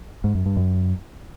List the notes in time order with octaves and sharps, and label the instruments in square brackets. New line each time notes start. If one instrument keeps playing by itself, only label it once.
[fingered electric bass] G#2
F#2
G2
F#2